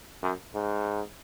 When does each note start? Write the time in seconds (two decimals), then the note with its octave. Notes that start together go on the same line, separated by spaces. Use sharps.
0.23 F#2
0.54 G#2